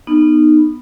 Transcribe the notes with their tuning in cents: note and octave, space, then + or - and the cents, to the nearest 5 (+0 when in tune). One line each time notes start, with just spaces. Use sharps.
B3 +0 D#4 -25